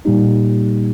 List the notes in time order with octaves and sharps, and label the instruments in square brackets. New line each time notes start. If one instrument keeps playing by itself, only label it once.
[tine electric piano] A#2 G3 A#3 D#4 G4